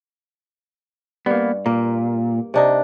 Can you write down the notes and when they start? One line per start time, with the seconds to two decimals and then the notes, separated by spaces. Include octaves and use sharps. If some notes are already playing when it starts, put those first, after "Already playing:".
1.26 G2 A#3 B3
1.66 A#2 A#3
2.54 C3 D4 D#4